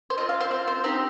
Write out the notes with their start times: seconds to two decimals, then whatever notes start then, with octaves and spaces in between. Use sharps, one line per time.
0.10 C5
0.18 C4 F4 D#5
0.29 F5
0.41 C5
0.51 C4 C5
0.54 F4
0.68 C5
0.84 C4 D#4 G4 C5